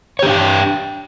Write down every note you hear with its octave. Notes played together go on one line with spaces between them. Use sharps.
D4 G4 C#5 G5